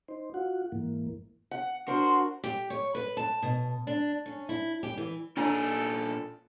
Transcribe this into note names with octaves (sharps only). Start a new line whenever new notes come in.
D#4 C5
F4 F#4 F#5
G#2 E3 A#3
F#5
D4 F#4 A#4 C5 C6
G4
C#5
B4
A5
B2
D4
C#4
E4
G4
E3
A#2 D4 D#4 A4 C#5 G#5 A#5